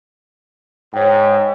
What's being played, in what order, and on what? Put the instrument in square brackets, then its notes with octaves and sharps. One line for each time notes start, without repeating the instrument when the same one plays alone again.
[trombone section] G#2 [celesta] C#5 G5